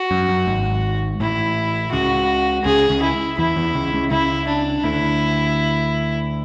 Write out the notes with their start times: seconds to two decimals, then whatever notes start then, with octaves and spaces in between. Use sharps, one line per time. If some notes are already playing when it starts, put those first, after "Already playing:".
Already playing: F#4
0.11 F#2
0.29 F#2
0.47 G#1 G#2
1.20 A1 A2 E4
1.92 C#2 C#3 F#4
2.65 C#2 C#3 G#4
2.90 C#2 C#3
3.02 E4
3.38 E2 E3 E4
3.56 E2 E3
3.74 C#2 C#3
3.93 C#2 C#3
4.11 C#2 C#3 E4
4.48 D4
4.84 D2 D3 E4